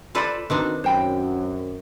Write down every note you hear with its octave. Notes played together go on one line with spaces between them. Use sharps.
F4 A4 B4 C5 D5 B5
B2 D#3 C4 D4 D#4 B4
F#2 C5 G5 B5